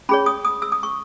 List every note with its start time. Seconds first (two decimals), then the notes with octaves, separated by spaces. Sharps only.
0.09 C#4 G#4 C#5 B5
0.26 D#6
0.45 D#6
0.62 E6
0.72 D#6
0.83 C#6